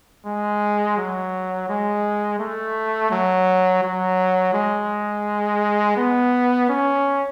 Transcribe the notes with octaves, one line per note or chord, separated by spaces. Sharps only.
G#3
F#3
G#3
A3
F#3
F#3
G#3
B3
C#4